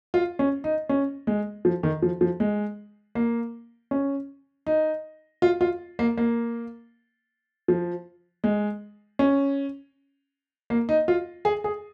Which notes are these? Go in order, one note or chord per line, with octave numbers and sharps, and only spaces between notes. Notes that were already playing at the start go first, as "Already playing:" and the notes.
F4
C#4
D#4
C#4
G#3
F3
D#3
F3
F3
G#3
A#3
C#4
D#4
F4
F4
A#3
A#3
F3
G#3
C#4
A#3
D#4
F4
G#4
G#4